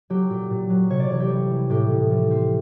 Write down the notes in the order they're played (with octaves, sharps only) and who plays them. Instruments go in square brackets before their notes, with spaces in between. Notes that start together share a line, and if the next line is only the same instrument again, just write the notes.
[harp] F#3 G4
A#2 G4
A#2
F#3
C3 C#5
D5
E3 C#5
G4
G3
E3
A2 G4
A2
F3
C4